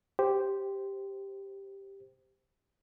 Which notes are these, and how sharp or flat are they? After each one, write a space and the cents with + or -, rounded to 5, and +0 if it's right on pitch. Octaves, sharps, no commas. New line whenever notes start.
G4 +0 C5 -10